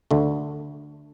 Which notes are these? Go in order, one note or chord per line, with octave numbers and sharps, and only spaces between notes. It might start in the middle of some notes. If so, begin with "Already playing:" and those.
D2 D3 A3